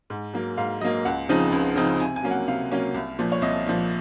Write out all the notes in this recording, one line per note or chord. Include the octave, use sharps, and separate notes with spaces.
G#2
F#3 A#3
G#2 F5
F#3 A#3 D#5
C#2 F#5
C#3 F3 C4 D#4
C#2
C#3 F3 C4 D#4
C3 G#5
G#5
F#3 A#3 C#4
F#5
C3 F5
F#3 A#3 C#4
C2
A#2 F3
C#5
C2 D#5
A#2 F3